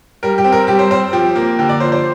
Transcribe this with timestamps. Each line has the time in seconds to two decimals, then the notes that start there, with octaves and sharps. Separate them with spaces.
0.23 G3 A#4
0.38 G4
0.44 C4
0.52 A#4
0.67 G3 G4
0.79 C5
0.90 C4 C5
1.13 F3 G4
1.36 A#3
1.59 D3 G4
1.69 D5
1.80 F3 C5
1.92 C5